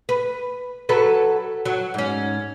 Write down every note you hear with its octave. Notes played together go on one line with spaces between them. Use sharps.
B4
F#3 A4 B4
F#3
G#2 C#4